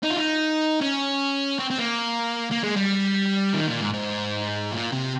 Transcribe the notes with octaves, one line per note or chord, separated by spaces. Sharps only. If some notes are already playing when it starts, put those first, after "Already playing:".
D#4
F4
D#4
C#4
C4
C4
A#3
A#3
G#3
G3
D#3
A#2
G#2
G#2
A#2
C3